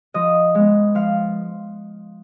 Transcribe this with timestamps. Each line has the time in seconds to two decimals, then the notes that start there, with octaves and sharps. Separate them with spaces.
0.14 F3 D#5
0.55 G#3 B3
0.95 F3 F5